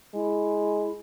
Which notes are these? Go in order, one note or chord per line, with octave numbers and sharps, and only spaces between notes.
G#3 E4